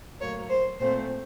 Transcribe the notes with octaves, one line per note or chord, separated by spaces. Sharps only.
A2 F#3 A#3 C#5
C5
A#2 A3 C4 C5